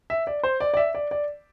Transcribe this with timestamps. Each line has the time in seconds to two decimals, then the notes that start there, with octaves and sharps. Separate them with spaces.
0.10 E5
0.27 D5
0.43 C5
0.60 D5
0.74 D5
0.77 E5
0.95 D5
1.11 D5